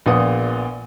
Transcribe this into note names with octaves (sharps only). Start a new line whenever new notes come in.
A#1 A#2 B3 F4 F#5 D#6